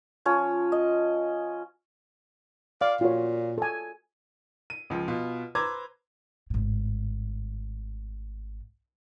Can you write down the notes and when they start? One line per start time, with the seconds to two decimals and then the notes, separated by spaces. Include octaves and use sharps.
0.25 F3 C#4 C#5
0.72 D#5
2.81 D5 F5
3.01 A#2 F4 F#4 C#5
3.58 A4 G#5
4.70 D#7
4.90 C#2 F3
5.08 B2 F4
5.55 B4 C5 A#5 D6 E6 G#6
6.50 G#1 A2